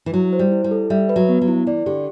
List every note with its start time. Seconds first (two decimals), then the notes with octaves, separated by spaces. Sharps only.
0.06 E3
0.13 F#3 E4
0.33 C5
0.39 G3
0.52 E4
0.64 G3
0.71 A4
0.90 G3 E5
1.09 B4
1.16 F#3
1.29 B3
1.41 F#3
1.48 E4
1.67 E3 D5
1.86 D3 G4